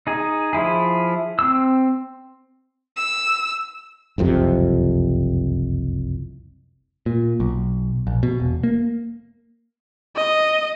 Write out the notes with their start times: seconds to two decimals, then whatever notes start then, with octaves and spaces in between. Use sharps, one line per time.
0.07 D#4 G#4
0.53 F3 E4 G#4
1.39 C4 E6
2.98 E6
4.18 F#1 C2 F2 C3
7.06 A#2
7.40 B1
8.07 A#1
8.23 B2
8.40 E1
8.63 A#3
10.16 D#5